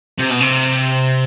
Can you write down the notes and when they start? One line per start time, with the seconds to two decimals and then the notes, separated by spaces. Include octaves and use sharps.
0.19 C3
0.30 B2
0.41 C3